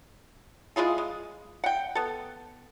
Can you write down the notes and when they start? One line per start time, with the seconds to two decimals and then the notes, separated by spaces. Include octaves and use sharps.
0.76 G#3 E4 F4 G#4
0.98 G#3
1.64 F#5 G5
1.95 B3 A4